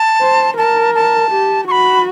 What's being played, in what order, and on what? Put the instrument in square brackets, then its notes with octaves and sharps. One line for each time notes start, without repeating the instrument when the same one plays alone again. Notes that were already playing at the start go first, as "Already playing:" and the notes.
Already playing: [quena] A5
[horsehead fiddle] C5
[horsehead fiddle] A#4 [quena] A5
[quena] A5
[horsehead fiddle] G4
[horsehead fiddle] F#4 [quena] B5 C#6